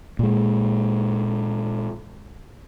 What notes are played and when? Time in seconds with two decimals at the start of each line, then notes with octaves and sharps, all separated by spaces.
0.19 A#2 G#3